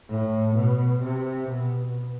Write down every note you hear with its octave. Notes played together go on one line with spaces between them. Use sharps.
A2
B2
C3
B2